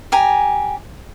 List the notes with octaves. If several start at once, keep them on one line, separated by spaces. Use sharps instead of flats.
G4 G#5 A#5